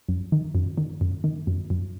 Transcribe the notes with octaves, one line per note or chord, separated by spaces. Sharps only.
F#2
D#3
F#2
D#3
F#2
D#3
F#2
F#2